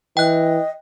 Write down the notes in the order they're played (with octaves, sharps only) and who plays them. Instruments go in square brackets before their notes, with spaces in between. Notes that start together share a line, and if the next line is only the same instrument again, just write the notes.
[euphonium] E3 [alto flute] D#5 [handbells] G5 F#6